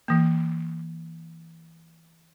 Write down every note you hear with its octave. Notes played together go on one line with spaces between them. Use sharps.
E3 A#3